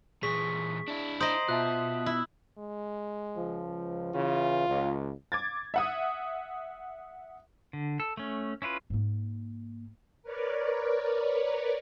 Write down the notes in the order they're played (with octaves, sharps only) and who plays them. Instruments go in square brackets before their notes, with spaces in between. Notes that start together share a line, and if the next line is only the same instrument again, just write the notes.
[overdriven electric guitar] A#2 E3 [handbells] G#4 C#6 [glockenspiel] B6
[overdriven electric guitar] D4 E4
[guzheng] C5 D#5 [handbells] A#5 D7 [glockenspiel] D#6 F#7
[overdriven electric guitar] B2 [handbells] F4 E5 A5 [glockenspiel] F#6
[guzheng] E4
[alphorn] G#3
[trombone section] C#2 F3
[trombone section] C#3 E3 [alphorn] F4
[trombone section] C#2
[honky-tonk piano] D6 G#6 A6
E5 F#5 D#6
[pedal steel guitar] D3
A4
A3 C#4
C#4 E4 F4 B4
[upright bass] G#2 A#3
[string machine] A#4 B4 C#5 D5